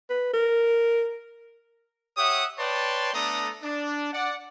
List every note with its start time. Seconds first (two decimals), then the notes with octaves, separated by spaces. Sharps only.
0.09 B4
0.34 A#4
2.17 G4 C#5 E5 F#5 D#6
2.58 B4 C#5 D5 G5 A5 C6
3.14 A3 B3 D4 A4 A#5 D#6
3.63 D4
4.13 D5 F#5